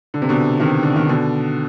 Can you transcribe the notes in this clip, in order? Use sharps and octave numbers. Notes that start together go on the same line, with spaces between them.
D3
C3
B2 D3
C3 D#3
D3
D#3
B2 D3